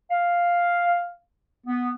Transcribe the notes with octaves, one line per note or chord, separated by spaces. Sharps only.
F5
B3